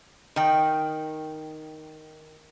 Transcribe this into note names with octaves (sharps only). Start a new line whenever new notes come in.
D#3 G5